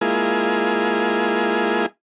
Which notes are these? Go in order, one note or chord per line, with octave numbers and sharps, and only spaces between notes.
G#3 A#3 E4 F4 G#4